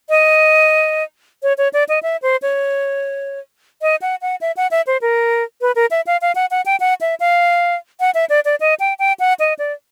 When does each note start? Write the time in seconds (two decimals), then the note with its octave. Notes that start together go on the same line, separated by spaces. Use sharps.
0.09 D#5
1.43 C#5
1.58 C#5
1.73 D5
1.89 D#5
2.03 E5
2.22 C5
2.42 C#5
3.82 D#5
4.02 F#5
4.22 F#5
4.41 E5
4.57 F#5
4.71 E5
4.87 C5
5.02 A#4
5.61 B4
5.76 A#4
5.91 E5
6.07 F5
6.22 F5
6.35 F#5
6.51 F#5
6.66 G5
6.80 F#5
7.01 E5
7.20 F5
8.00 F#5
8.15 E5
8.30 D5
8.45 D5
8.60 D#5
8.80 G5
8.99 G5
9.20 F#5
9.40 D#5
9.59 D5